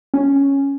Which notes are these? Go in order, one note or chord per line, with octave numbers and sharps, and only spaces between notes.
C#4